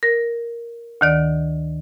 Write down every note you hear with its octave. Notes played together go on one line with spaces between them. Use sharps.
A#4
D2 D#3 D5